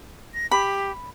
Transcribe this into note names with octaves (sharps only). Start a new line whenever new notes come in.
A#6
G4 B5